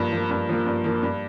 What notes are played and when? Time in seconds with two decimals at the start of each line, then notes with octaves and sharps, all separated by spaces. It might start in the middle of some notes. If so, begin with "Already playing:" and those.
Already playing: G2 F3 A#3
0.12 F3 A#3
0.31 G2
0.49 F3 A#3
0.67 G2
0.84 F3 A#3
1.03 G2